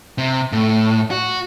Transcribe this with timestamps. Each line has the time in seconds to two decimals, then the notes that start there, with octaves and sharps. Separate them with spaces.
0.18 C3
0.53 A2
1.11 F#4